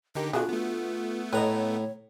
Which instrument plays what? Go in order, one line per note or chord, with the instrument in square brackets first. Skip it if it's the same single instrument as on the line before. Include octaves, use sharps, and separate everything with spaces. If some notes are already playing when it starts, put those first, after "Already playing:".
[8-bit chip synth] D3 D#4 G4 [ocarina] A#4
[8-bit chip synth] B2 [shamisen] D3 F#4 G#4 [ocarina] F4
[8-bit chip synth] A3 B3
[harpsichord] A2 A#5 [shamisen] B4 D#5 [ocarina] C#5